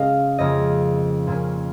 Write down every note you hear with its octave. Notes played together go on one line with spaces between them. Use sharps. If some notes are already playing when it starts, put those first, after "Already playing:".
Already playing: C#3 G#3 C#4 D#5 F5
F2 C#3 A#3 D#5
A#2 A#3 C#4